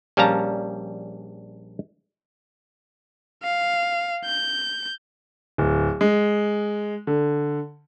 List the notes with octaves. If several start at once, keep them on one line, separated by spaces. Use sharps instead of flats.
A#1 G3 C#4 F5 A5 A#5
F5
G6
D1
G#3
D3